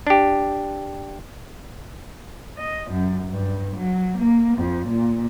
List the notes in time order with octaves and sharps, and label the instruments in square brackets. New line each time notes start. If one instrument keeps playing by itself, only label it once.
[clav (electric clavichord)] D4 G4
[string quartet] D#5
F#2
G2
F#3
A#3
F2
A#2